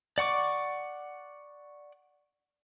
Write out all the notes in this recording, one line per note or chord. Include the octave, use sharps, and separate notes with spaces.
D5 F#5 C#6 D6